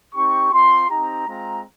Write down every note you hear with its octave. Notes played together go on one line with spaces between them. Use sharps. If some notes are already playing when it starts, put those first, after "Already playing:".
C4 D#4 G4 C#6
C4 F4 C6
C4 D#4 G4 A#5
G#3 C4 F4 A#5